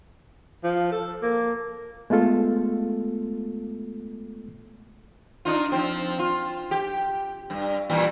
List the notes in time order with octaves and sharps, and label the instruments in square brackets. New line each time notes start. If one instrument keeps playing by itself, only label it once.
[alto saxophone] F3
A4
A#3
[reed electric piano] G#3 A3 B3 F4 A4
[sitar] D4 D#4 F4
F3 C4
F4
G4
G2
A#2 E3 G3